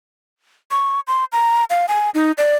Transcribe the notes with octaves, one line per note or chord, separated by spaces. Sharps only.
C#6
C6
A#5
F5
G#5
D#4
D5